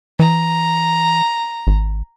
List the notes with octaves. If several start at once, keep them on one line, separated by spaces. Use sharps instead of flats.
E3 A#5
G#1